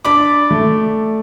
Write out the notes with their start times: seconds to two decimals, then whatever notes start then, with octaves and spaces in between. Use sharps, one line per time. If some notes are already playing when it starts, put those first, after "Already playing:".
0.04 D4 D5 B5 D6
0.51 A3